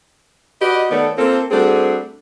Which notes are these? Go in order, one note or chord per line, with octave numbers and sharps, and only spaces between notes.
F#4 G4 B4 D5 D#5
D#3 A3 B3 A4 C#5 D5
A#3 C4 F4 A4
G3 A3 C4 D4 F#4 G#4